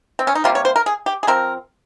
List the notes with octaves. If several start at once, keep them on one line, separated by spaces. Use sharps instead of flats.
C4
C#4
D#4
C3 G3 A#3 F4
C#5
C5
A#4
G#4
G4
G#4
F3 C4 A#4